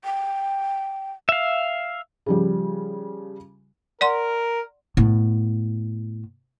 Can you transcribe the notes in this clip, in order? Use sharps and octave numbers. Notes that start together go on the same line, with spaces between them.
G5
E5 F5
C#3 F3 G3
A#4 D5 F#5 C6
A2 B3